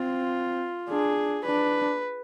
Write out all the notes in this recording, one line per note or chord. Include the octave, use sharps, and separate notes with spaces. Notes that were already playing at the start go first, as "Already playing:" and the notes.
Already playing: C4 F4
D4 G#4
D4 B4